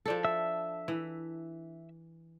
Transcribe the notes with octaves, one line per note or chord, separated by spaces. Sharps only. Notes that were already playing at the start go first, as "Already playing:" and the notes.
F3 D4 A4
E5 E6
E3